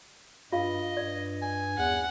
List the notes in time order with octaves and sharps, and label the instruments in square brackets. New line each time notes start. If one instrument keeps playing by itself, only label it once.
[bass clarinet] G2 [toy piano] F4 F5 [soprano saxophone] D#5
[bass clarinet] G2 [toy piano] D5
[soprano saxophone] G#5
[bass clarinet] E2 [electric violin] F#5